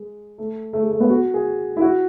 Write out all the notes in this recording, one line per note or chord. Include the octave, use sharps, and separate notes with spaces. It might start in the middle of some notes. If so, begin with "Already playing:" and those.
Already playing: G#3
A3
A3
G#3
A3
B3
F#4
G#4
E4
F#4